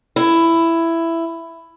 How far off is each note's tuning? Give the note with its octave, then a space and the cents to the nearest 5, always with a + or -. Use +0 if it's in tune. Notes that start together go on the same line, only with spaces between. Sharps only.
E4 +10